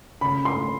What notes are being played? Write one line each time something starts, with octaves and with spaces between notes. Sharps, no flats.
C#3 B5
C6